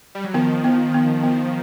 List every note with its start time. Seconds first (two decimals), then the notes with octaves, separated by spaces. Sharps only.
0.15 G3
0.24 F#3
0.34 D#3 F3 B3
0.64 B3
0.94 B3
1.23 B3